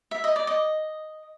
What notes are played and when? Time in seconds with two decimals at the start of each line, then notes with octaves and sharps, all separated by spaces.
0.11 E5
0.24 D#5
0.36 D5
0.47 D#5